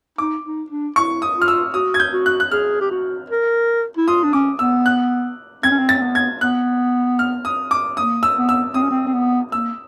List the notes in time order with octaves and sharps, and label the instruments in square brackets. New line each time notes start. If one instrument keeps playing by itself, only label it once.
[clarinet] D#4 [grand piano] D6
[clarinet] D#4
D4
[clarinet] E4 [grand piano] C#6
[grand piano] D#6
[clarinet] F4
[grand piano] F6
E6
[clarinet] F#4 [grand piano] D#6
[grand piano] G#6
G6
[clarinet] F#4
[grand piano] F#6
F#6
[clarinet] G#4 [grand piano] F6
[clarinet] G4
F#4
A#4
E4
[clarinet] F4 [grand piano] D#6
[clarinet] D4
[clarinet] C#4 [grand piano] D6
[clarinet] B3 [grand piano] E6
[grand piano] F#6
[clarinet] C4 [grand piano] G#6
[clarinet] C#4
C4
[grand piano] A6
[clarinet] C4
B3
[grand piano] G#6
[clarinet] B3 [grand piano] F#6
[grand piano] F6
D#6
D6
[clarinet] A#3 [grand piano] D#6
[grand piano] E6
[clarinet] B3
[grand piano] E6
[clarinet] C4 [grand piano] D#6
[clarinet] C#4
C4
C4
B3
[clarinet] A#3 [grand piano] E6